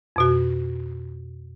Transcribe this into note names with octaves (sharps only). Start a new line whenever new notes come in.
F2 B2 F#4